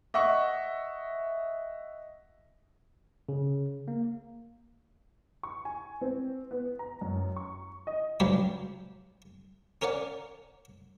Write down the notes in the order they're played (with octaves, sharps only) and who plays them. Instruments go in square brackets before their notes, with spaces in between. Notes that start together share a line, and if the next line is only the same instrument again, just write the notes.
[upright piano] D#5 E5 F#5 C#6
[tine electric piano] C#3
A#3
[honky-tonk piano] C#6
G#5
C4
B3
A#5
F#2
C#6
D#5
[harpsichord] C#2 G2 F#3 B4 D5 G5
C#4 A#4 C#5 D5 F#5